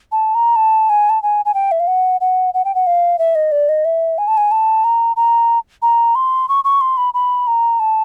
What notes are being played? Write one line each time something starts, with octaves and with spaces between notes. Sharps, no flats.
A5
A#5
A5
G#5
A5
G#5
G#5
G5
E5
F5
F#5
F#5
F#5
G5
F#5
F5
E5
D#5
D5
D#5
E5
G#5
A5
G#5
A5
A#5
A#5
A#5
C6
C#6
C#6
C6
B5
B5
A#5
A5